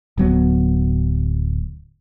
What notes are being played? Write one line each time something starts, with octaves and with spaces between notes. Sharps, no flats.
D1 F#3 B3